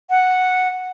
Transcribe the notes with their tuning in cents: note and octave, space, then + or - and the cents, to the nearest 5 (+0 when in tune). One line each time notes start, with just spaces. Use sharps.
F#5 -5